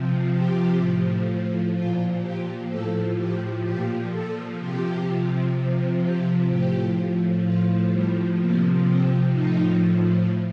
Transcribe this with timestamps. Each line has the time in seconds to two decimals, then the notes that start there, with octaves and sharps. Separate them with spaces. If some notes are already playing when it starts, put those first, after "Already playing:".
Already playing: C3 F3
0.31 G4
0.78 A2 F3
1.73 A#2 F3 F4
2.21 G4
2.67 A2 F3 A4
3.16 G4
3.62 A#2 F3 G4
4.11 A4
4.58 C3 F3 G4
5.52 C3 F3
6.00 G4
6.48 A2 F3 G4
7.42 A2 F3 F4
7.90 G3
8.38 C3 F3 A#3
8.85 C4
9.32 A2 F3 D#4